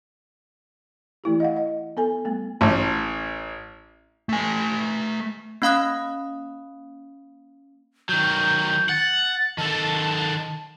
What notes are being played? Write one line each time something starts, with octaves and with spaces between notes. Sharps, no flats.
E3 A3 E4 G4
D#5 F5 F#5
D#5
B3 A4 G#5
G3 A3 B3
A1
A3 G#5
A#3 C#4 F5 B5 D#6 F#6
D#3 F#3 G6
F#5 A6
D#3 A4 A5